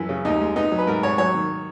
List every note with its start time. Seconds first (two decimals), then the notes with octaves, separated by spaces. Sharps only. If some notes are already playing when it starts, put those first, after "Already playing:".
Already playing: F#2 E3
0.09 C#3
0.25 D#2 D#4
0.41 G#3
0.56 B3 D#4
0.71 F#3
0.78 B4
0.87 G#2 A#4
1.03 G#2 C#5
1.18 F#3 C#5
1.34 D#3